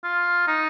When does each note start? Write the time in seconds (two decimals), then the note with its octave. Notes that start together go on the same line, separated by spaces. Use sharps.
0.04 F4
0.48 D#4